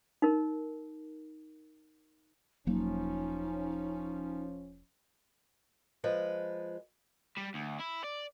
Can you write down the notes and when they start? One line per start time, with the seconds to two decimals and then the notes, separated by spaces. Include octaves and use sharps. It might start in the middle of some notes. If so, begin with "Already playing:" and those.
0.22 D#4 A#4
2.67 E1 F3 F#3 A#3 C#4 D#4
6.04 F3 G#3 B4
7.38 G3
7.55 D2
7.81 E4
8.04 D5